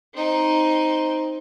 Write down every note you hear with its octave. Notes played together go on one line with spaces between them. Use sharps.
C4 D#4